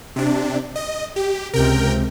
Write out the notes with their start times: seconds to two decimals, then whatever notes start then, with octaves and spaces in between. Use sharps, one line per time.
0.16 C3 D4
0.76 D#5
1.16 G4
1.53 C#2 C3 A#4 G5